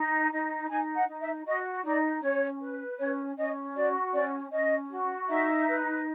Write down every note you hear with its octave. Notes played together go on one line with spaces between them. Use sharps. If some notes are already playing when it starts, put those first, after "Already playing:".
Already playing: D#4
D#4
D#4 G#5
F#5
D#4
E5
F#4 D#5
D#4 D5
C#4 C#5
B4
C#4 C#5
C#4 D#5
F#4 D5
C#4 D5
C#4 D#5
F#4
D#4 E5
B4